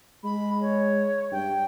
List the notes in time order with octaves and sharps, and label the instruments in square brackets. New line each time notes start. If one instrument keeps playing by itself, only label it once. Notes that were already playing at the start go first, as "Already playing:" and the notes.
[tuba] G#3 [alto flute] B5
[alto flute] C#5
[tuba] G2 [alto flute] G5